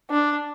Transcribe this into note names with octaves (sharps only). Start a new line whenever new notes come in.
D4